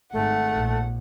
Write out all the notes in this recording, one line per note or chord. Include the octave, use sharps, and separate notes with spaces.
G#1 A3 F#5
A#1